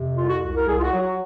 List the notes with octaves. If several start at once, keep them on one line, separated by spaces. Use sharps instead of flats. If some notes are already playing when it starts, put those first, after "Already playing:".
Already playing: F2 C3
C2 F4
F#4
C2 F#4
A#4
C2 G#4
F4
F#4
F#3
F#4